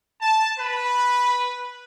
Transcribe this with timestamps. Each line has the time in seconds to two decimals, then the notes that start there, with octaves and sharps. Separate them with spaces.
0.20 A5
0.59 B4